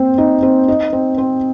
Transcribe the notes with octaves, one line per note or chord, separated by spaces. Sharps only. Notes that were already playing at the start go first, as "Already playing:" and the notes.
Already playing: A#3 C4 C5
D#4 D#5
C4 C5
D#4 D#5
C4 C5
C4 C5